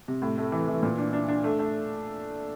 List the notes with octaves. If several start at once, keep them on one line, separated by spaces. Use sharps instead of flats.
C3
A2
A3
E3
E3
A#2
D4
D4
D4
A3
A3